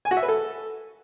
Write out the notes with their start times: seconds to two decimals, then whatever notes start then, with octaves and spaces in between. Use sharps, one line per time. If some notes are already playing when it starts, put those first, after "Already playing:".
0.05 G#5
0.11 F#4
0.17 E5
0.23 B4
0.28 A4